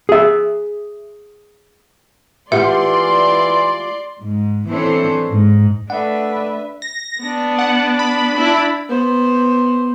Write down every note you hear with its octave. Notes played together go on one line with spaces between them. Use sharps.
G#4 E5
E3 F4 G4 D5 E5 F#5 C6
G#2
E3 C4 D4 A4 C5 C#5
G#2
A3 D4 B4 E5 F#5
A#6
B3 D4
F#5
B5
D4 E4
B3 C5